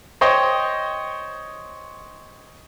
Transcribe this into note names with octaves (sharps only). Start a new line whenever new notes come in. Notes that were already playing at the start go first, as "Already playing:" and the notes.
C5 C#5 D#5 G5